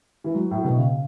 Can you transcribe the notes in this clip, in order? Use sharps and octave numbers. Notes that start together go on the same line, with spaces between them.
E3
F#3
A2
B2
C#3